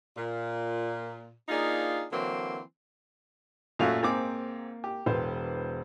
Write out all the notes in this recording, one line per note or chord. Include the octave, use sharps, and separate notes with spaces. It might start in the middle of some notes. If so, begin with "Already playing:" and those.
A#2
A#3 D4 D#4 F4 G#4
D3 E3 F#3 A#3 C4
F#2 A#2 A3 F#4 F5 F7
G#2 A#3 C4 D6
G4
E1 B4 C5